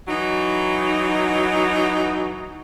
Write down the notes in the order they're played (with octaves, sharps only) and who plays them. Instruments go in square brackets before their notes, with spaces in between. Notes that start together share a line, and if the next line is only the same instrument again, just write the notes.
[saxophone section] E3 F#3 D#4